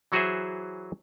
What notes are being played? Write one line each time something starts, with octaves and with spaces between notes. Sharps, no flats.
E3 F#3 F#4 G#4 C5 E5